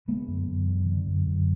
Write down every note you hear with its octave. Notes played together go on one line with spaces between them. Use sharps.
D3 G#3 B3
F#2
F#2
D3
D3
F#2
F#2